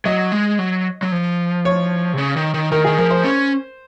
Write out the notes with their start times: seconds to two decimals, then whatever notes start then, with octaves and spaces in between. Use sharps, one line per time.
0.05 F#3 D#5
0.32 G#3
0.59 F#3
1.03 F#3
1.12 F3
1.65 C#5
2.14 C3
2.18 C#3
2.36 D#3
2.54 D#3
2.72 D#3 A#4
2.85 D#3 G#4
2.98 F3 A#4
3.10 C5
3.24 C#4